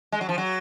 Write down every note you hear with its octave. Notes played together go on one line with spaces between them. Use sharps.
G#3
F#3
F3
F#3